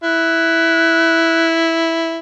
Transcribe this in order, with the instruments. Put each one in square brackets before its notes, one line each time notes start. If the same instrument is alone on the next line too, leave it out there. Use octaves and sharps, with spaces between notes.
[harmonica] E4 [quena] F#6